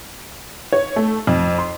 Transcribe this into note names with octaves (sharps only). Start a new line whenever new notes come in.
C#5
A3
F2
C6